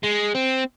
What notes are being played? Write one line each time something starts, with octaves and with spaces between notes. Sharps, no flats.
G#3
C4